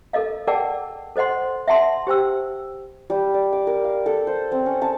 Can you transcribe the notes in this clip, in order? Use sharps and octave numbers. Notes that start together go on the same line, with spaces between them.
A4 A#4 D#5 F5
G#4 A#4 D5 F#5 G5 A5
A4 C5 D#5 F#5 C6
E5 F#5 A5 C6
G4 C5 G5 E6
G3
D5
D6
A#4
F5
A4
C5
C4
C#4
A5